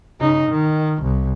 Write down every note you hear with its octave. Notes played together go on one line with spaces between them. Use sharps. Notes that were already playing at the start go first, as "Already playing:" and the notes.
C#3 D#4
D#3
C2